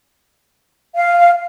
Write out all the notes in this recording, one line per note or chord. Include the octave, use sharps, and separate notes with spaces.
F5